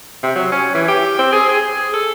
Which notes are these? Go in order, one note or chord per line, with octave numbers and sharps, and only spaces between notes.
C3
F#3
C#4
E3
G4
C4
G#4
G#4
A4